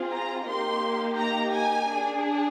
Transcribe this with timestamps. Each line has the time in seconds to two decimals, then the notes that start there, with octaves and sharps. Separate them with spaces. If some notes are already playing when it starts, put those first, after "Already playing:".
Already playing: C4 F4 G#4
0.11 A#5
0.46 A#3 D#4 G4 C6
1.17 A#5
1.52 G#5
1.88 D4 G#4